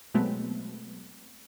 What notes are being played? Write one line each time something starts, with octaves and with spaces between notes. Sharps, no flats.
B2 F#3 G#3 A3 B3 C4